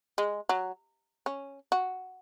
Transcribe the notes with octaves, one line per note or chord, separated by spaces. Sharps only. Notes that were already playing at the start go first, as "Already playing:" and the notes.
G#3
F#3
C#4
F#4